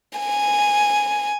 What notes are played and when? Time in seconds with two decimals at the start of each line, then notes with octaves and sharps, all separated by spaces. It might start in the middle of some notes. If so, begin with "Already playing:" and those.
0.19 G#5